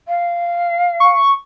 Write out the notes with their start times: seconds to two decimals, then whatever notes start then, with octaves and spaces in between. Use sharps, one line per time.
0.08 F5
1.00 C#6